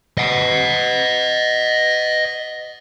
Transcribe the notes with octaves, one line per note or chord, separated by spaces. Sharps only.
D#5 F#5